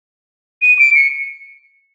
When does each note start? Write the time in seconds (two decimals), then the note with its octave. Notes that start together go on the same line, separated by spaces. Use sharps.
0.62 D#7
0.79 D7
0.95 C#7